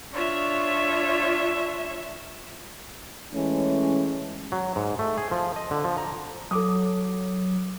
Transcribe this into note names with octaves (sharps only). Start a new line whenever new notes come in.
D4 F4 C#5 E5
E3 G#3 A3 C#4
F#3
G#2
A3
G#4
F3
D#5
D3
F3
A#5
F#3 A4 D6 D#6